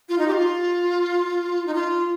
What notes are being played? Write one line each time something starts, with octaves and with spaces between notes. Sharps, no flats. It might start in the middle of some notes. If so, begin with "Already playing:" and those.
F4
D#4
G4
F4
D#4
F4